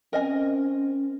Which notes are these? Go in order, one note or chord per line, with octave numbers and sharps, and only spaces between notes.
C4 C#4 A#4 D#5 G#5